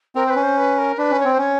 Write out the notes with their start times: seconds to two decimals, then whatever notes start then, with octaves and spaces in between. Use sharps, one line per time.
0.15 C4 A#4
0.26 C5
0.30 B4
0.36 C#4
0.43 C5
0.57 B4
0.78 A#4
0.98 D4 B4
1.11 C#4
1.20 C#5
1.25 C4
1.32 C5
1.38 C#4 C#5